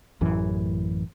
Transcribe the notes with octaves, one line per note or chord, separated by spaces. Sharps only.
A1 F#2 E3